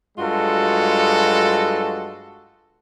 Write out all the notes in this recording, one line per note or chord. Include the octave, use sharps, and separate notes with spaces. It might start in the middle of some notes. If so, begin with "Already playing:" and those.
G2 F#3 G#3 F4 F#4 A4